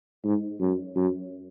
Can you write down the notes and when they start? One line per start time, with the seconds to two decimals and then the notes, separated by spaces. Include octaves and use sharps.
0.24 G#2
0.61 F#2
0.96 F#2